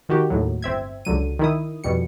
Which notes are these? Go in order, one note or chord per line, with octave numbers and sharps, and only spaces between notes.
D#3 F#4 G4
D#2 A2 F#3
G1 C4 E5 G#6
C#2 D3 F#3 D#7
D#3 E4 D#6
F2 B2 G3 C#7